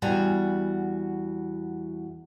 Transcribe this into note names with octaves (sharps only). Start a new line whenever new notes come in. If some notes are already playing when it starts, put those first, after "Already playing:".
E2 G3 F#4 G#5